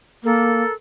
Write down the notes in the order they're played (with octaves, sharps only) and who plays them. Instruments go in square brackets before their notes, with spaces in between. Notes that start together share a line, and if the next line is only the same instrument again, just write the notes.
[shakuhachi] A#3 [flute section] A4 A#4